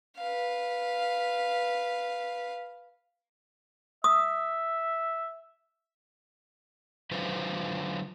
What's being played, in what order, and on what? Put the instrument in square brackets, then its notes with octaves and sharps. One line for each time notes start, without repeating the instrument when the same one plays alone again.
[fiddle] B4 F5
[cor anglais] E5 [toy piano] D#6
[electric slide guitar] D3 F#3 F4 B4 C5